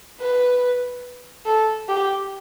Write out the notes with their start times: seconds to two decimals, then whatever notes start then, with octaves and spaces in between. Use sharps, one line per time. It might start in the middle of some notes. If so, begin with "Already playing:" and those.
0.20 B4
1.46 A4
1.88 G4